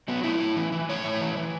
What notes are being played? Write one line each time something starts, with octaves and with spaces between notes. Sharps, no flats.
F#3 B3
A2 E4
A2
E3
E3
A2 C#5
A2
E3
E3